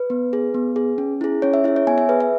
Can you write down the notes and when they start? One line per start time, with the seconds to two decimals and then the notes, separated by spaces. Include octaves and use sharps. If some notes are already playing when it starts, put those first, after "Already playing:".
Already playing: B4
0.10 B3
0.33 G#4
0.54 B3
0.76 G#4
0.98 C#4
1.21 E4 G#4
1.42 C#4 C#5
1.54 E5
1.64 E4 G#4 E5
1.76 C#5
1.87 B3 G#5
1.98 E5
2.09 G#4 B4
2.20 E5